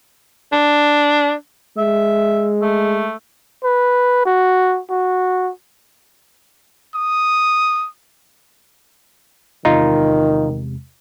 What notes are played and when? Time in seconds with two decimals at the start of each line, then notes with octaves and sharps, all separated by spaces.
0.52 D4
1.78 G#3 E5
2.62 A3
3.64 B4
4.26 F#4
4.90 F#4
6.95 D#6
9.65 E2 C3 D#3 G#3 D#4 F4